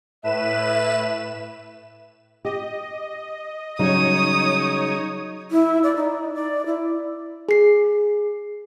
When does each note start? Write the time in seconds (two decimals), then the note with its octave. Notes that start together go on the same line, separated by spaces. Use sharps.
0.23 A2 B4 E5 E7
2.45 G4 D#5
3.79 C#3 F#3 G3 D#4 C#5 D#6
5.51 E4
5.83 D5
5.96 D#4
6.34 D5
6.66 E4
7.49 G#4 C7